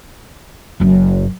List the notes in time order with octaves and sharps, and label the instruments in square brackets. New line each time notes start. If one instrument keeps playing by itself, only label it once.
[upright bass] F#1 F#2